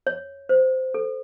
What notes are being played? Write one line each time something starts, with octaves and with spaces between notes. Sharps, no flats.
C#5
C5
A4